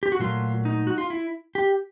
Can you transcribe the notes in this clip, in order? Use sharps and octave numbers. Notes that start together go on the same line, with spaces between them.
G4
F#4
A#2 F#3 A3 F4
D#4
F#4
F4
E4
G4